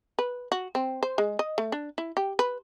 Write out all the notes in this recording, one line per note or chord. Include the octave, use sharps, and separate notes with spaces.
B4
F#4
C4
C5
G#3
D#5
A3
D4
E4
G4
B4